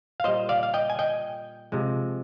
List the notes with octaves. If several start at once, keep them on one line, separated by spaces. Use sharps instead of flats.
F5
A#2 G3 C5 D#5
D5 F5
F5
D#5 G5
G#5
D#5 G5
C3 F3 G#3